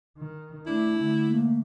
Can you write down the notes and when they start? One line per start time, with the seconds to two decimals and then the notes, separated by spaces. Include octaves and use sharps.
0.17 D#3
0.66 A3 D4 E4
0.98 D3 A3
1.29 A#3